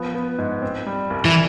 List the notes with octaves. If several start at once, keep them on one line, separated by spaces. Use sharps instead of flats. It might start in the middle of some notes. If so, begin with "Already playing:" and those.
Already playing: F3 B3
B3
G#2
C4
G3
C2
E3